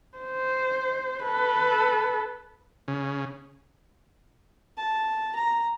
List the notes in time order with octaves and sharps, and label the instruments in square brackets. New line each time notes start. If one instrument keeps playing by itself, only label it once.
[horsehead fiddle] C5
A4 B4
[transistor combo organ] C#3
[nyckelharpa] A5
A#5